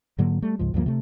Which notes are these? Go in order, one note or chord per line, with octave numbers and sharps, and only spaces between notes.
G#2 D3 F#3 A#3
G3 A3
C#2 G#2 F3
D2 G2 F3 A#3
C3 A3